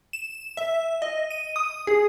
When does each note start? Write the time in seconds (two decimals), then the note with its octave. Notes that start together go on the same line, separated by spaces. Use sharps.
0.13 E7
0.57 E5
1.02 D#5
1.30 D#7
1.56 D#6
1.87 G#4